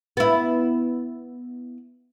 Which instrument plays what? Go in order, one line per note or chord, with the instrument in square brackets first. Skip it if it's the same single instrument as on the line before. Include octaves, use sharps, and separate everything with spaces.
[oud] B3 E4